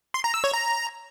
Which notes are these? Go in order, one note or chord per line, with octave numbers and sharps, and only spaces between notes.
C6
A#5
E6
C#5
A#5